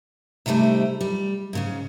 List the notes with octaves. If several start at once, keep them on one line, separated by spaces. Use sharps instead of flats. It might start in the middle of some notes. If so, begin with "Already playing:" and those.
C3 D#3 G3 A3 C4
G3
G#2 C#3 C#4